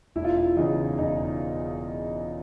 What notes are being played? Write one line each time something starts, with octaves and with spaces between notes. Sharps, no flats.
E1 E4
F4
E4
E2 C#3 D#4
E1 D#4